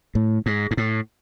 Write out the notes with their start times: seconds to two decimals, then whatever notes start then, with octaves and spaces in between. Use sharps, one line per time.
0.15 A2
0.46 G#2
0.71 G#2
0.77 A2